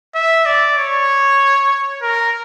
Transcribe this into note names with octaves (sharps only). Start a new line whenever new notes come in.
E5
D5
C#5
A#4